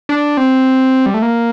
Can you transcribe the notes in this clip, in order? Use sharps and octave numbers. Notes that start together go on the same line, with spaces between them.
D4
C4
G3
A3
A#3